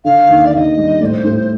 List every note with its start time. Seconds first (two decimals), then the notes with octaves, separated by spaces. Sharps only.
0.05 D3 F5
0.29 D#2
0.45 D5
0.54 D#2 D#5 F5
0.78 G3
1.01 A2 D5
1.05 C5
1.24 A2